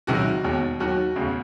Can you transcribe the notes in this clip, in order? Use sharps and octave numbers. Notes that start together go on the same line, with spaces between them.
C#2 C3 D#3 F#3 F#4
E1 D#2 D#3
D#2 D#3 F#3 F#4
E1 D2 C#3